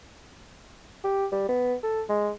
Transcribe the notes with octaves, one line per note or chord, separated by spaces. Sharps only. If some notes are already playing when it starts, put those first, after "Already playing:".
G4
G3
B3
A4
G#3